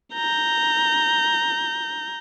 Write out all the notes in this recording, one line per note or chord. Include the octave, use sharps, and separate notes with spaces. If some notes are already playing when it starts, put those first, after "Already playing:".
A#5 G6